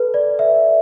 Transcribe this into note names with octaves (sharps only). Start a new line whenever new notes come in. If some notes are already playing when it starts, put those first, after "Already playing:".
Already playing: A4 B4
D5
E5